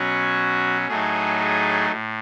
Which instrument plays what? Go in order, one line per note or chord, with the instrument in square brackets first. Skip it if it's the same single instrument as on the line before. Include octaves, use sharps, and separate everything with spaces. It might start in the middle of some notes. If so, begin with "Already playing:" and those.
Already playing: [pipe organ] B2 F#3 C#4 F#4
A2 F#3 A3 D#4 G#4
G#4
A2